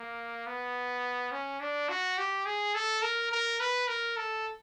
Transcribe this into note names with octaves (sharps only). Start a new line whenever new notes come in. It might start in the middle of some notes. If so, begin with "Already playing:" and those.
Already playing: A#3
B3
C#4
D4
F#4
G4
G#4
A4
A#4
A#4
B4
A#4
A4